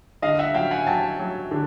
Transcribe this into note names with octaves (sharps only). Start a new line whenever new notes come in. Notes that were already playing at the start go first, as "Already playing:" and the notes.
D3 D#5 F5
E5 F#5
F#3 F5 G5
F#5 G#5
F#3 G5 A5
F#3
D3